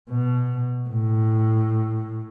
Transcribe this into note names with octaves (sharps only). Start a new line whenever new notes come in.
B2
A2